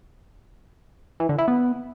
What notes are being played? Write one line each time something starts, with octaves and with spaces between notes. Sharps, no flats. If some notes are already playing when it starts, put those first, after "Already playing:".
E3
D3
E4
B3